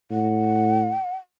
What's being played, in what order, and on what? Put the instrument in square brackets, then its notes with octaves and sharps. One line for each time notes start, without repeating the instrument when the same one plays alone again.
[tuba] A2 [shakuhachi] F#5